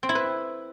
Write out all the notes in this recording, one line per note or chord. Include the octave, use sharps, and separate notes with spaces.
C4
E4
B4